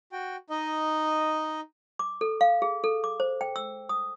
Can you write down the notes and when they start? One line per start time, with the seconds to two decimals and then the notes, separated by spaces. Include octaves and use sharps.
0.12 F#4 G5
0.50 D#4 D#5
1.99 D6
2.21 A4
2.41 F5
2.62 G#4
2.84 A4
3.04 D6
3.20 C5
3.41 G5
3.56 E6
3.89 D#6